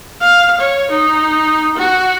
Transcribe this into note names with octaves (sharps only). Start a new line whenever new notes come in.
F5
C#5
D#4
F#4